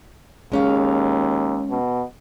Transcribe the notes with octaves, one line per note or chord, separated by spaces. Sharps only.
D#2 G#3 C#4 F5
B2